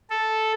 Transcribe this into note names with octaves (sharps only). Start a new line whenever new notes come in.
A4